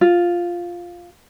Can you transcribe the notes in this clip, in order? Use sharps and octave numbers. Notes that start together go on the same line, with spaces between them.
F4